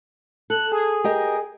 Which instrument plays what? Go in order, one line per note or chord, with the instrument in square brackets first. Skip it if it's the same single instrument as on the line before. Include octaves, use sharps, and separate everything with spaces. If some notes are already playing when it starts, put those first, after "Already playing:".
[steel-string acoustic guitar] A4 [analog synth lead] F#6
[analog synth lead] G#4
[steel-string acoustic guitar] G4 A#4 D#5